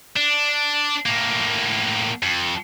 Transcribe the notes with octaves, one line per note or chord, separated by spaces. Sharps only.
D4
A2 A#3
F2